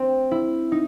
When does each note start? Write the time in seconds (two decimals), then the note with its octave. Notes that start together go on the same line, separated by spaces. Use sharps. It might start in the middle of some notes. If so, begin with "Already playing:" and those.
Already playing: C4
0.31 E4
0.72 D#4